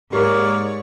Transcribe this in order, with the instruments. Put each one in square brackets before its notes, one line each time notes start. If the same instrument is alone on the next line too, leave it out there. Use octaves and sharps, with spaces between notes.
[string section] G#2 [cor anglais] A#3 [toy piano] G4 A#4 [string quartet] C#5 D5 C#6